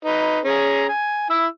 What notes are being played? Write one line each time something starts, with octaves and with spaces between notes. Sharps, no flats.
D#4 B4
C#4 G#4 A#5
G#5
E4 E6